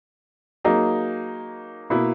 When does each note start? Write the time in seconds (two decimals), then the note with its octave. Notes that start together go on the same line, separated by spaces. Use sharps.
0.64 F#3 A#3 D#4 G#4
1.90 B2 A#3 E4